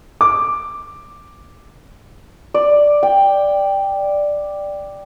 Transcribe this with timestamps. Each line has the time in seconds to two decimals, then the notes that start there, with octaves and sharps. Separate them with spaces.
0.21 D6
2.54 D5
3.03 G5